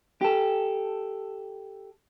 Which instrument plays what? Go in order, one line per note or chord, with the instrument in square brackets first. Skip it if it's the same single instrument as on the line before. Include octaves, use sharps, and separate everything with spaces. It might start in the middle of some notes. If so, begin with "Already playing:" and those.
[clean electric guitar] G4 A4